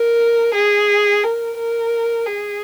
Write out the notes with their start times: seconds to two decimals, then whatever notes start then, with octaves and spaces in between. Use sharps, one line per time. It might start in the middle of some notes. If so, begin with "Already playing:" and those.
Already playing: A#4
0.54 G#4
1.23 A#4
1.58 A#4
2.26 G#4